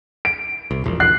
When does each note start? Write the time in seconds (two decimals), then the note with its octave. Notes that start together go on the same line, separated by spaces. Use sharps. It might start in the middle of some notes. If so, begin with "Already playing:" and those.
0.25 D7
0.71 C2
0.84 E1 A#1
1.00 F#6 C7